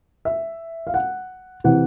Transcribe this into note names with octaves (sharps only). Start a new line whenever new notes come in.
E5
F5
F#5
C3 E3 F#5